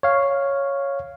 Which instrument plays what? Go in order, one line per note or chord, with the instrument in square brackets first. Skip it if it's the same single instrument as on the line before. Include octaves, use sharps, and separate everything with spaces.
[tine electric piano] C#5 F5